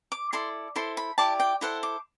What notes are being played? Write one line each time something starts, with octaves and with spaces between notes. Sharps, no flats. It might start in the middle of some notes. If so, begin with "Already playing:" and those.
D6
E4 A4 D5 C6
E4 A4 C5 C6
B5
E4 G4 D5 A5
G5
E4 A4 C5 F#5
D6